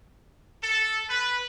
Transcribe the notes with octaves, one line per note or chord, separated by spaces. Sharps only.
A4
B4